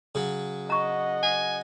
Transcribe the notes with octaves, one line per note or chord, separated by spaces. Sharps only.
C#3 F#3
D#5 F#5 A#5 C#6
G#5